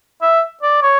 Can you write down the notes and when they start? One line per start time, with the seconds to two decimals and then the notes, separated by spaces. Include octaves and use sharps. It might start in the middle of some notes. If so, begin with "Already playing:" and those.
0.22 E5
0.63 D5
0.83 C#5